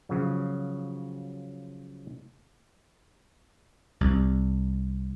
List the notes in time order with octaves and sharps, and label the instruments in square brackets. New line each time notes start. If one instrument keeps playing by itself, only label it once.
[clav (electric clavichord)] C#3 F3 F#3
[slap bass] C2